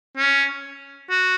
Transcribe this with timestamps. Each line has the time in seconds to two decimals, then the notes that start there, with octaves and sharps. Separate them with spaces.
0.17 C#4
1.10 F#4